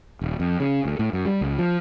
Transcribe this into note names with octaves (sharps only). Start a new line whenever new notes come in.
D#1
F2
C#3
D2
A2
F#2
G3
C#2
F3